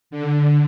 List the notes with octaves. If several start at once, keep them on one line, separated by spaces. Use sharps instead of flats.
D3